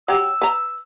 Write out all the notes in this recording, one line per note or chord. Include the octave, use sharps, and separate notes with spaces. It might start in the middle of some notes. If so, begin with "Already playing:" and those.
F#3 G4 E6
B4 A#5